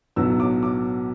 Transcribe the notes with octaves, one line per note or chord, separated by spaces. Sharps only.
B1 A2 F#3 B3 D4 E6
D6
D6